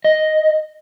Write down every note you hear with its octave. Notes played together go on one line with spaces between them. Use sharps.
D#5